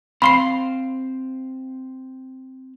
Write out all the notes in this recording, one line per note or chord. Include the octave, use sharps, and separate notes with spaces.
C4 C5 F5 B5 C6 C7